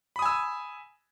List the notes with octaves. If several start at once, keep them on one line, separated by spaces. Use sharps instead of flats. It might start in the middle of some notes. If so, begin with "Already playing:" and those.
G#5 B5 D#6 E6